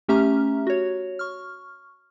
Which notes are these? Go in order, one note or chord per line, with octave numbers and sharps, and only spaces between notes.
A3 C#4 G4 E5 A#5 F6
F#4 C#5
C#6 F6